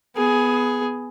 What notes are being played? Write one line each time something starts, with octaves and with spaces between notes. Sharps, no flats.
B3 G#4